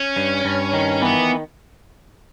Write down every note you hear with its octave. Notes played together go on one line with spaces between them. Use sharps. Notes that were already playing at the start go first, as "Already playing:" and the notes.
Already playing: C#4
G2
G2
D#3
E3 B3